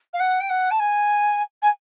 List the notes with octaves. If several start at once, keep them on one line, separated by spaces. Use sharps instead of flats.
F5
F#5
G5
F#5
A5
G#5
G#5